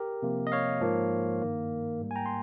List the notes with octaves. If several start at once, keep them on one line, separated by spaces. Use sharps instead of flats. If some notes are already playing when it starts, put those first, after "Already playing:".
Already playing: G4 A#4
C3 F3 A#3
D#5
C#5 F5
G#2 F3 A#3
G2 D#3 A#3
G#2 G3 A#3
G#5
G5 A#5
C6